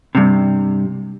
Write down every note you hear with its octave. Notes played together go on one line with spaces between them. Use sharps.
G2 C3